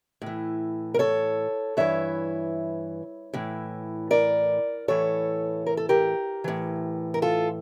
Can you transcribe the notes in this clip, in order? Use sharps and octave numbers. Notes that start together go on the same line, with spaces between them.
A2 E3
A#4
A4 C#5
G2 E3 C#5 E5
A2 E3
A#4 D5
A2 E3 A4 C#5
A#4
A4
G4 A#4
A2 E3
A#4
F4 A4